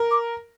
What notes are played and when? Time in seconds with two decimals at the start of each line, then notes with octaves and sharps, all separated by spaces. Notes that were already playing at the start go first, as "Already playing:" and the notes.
Already playing: A#4
0.10 D6